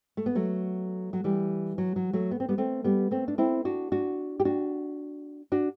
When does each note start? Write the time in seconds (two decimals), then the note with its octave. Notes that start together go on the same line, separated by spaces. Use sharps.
0.17 A3
0.26 B3
0.35 F#3 A3
1.13 F#3
1.24 E3 G3
1.78 F#3
1.96 F#3
2.13 F#3 A3
2.31 B3
2.40 C4
2.49 G3 B3
2.58 A3 C4
2.84 G3 B3
3.11 A3 C4
3.28 D4
3.38 C4 E4
3.65 D4 F#4
3.92 D4 F#4
4.40 G4
4.45 D4 F#4
5.52 D4 F#4